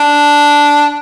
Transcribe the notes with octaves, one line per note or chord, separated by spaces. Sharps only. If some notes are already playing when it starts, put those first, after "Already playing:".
Already playing: D4